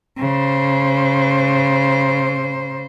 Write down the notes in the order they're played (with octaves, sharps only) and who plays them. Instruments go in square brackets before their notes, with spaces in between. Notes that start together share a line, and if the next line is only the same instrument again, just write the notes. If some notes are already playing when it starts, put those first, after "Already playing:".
[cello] C#3 C5